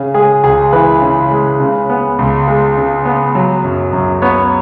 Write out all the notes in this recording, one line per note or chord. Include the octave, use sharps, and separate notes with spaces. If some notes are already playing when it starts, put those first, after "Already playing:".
Already playing: C#3
G#3 G#4
C#2 G#4
E3 B4
C#3
G#3
C#3
B3
C#2
G#3
C#3
B3
F#3
F#2
F#2
B3 C#5